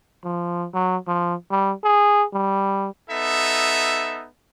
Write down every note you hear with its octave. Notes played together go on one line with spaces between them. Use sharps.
F3
F#3
F3
G3
G#4
G3
B3 D#4 A4 E5